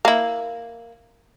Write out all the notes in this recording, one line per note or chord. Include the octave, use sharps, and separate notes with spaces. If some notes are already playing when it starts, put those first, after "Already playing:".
A#3 E4